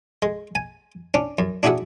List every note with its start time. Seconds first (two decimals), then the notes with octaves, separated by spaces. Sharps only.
0.22 G#3
0.55 G#5
1.14 C#4 D4
1.39 F#2
1.63 D4 E4 F#4 G#4 E5 F#5